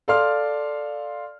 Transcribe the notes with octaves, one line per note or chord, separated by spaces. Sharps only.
A4 D5 F5 C6 F6